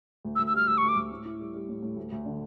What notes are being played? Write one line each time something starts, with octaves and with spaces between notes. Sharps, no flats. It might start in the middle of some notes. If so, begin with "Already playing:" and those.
D2
E6
D2
E6
G3 F6
D2 E6
D2 C#6
D6
D2
A2
E4
G3
G3
A2
A2
D2
D2
D3